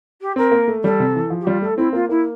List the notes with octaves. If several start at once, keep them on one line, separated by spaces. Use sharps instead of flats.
G4
C4 A#4
A#3
A3
G3 A4
C3
E3
F3
G4
G3 F4
A3 A4
C4 E4
A#3 F4
A#3 E4